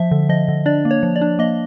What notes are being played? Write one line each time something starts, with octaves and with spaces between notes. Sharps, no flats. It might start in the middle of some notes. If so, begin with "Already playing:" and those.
Already playing: F3 E5
D3
F3 D#5
D3
D4 D5
A#3
C#5
F3
D5
D4
A#3 D#5